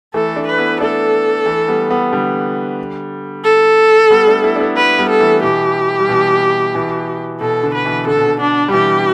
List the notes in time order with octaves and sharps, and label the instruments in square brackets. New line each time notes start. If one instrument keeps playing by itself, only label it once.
[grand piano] E3 A3 [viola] A4
[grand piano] A3 D4
[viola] B4
[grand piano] B3 E4
[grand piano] A3 D4 [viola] A4
[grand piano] E3 A3
G3 B3
G3 B3
D3 G3
[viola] A4
[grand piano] G3 B3
A3 D4
B3 E4
D4
B3 E4
[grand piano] B3 E4 [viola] B4
[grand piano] G3 B3
[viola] A4
[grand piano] E3 A3
[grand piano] B2 E3 [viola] G4
[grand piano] G3
B2 E3
B2 E3
[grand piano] B2 [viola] A4
[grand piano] D3
[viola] B4
[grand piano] B2 E3
[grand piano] D3 [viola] A4
[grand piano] B2
D3
[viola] D4
[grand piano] G3
[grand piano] B2 E3 [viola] G4